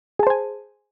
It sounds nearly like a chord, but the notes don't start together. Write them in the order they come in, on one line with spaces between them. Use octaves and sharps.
G#4 A5 C5 G#5